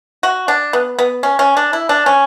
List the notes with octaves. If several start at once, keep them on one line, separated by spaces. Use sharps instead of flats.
F#4
D4
B3
B3
C#4
C#4
D4
E4
D4
C#4